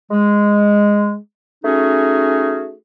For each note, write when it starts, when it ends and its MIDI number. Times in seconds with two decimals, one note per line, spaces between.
0.11 1.16 56
1.64 2.73 57
1.64 2.73 61
1.64 2.73 63
1.64 2.73 66
1.64 2.73 68